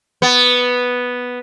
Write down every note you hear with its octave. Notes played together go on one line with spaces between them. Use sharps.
B3